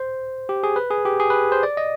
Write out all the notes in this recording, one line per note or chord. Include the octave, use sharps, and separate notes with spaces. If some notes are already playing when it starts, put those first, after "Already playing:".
Already playing: C5
G4
G#4
B4
G#4
G4
G#4
B4
C5
D5
D#5